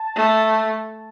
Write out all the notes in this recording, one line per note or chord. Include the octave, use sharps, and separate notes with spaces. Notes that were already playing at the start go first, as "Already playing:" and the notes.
Already playing: A5
A3